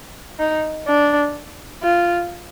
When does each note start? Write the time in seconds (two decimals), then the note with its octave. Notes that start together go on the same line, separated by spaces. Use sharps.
0.40 D#4
0.87 D4
1.83 F4